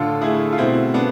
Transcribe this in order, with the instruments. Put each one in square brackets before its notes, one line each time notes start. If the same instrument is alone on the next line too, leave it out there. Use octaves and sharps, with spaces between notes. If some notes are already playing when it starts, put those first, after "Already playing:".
Already playing: [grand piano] A2 D3 [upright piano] F4 A4
[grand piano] A3 [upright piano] E4 G#4
[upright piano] F4
[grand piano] B2 [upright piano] C4 E4
[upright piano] B3 D4